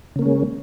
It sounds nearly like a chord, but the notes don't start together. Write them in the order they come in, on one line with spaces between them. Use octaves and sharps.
C#3 A#3 C#4 G#3